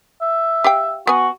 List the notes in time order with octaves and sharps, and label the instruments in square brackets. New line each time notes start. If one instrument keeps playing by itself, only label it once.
[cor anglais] E5
[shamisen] G4 F5 G5
[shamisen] B3 G#5 [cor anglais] F#4